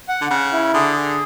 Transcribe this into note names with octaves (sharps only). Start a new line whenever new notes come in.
F#5
D3
C#3 F#5
E4
D3 G#4
G#4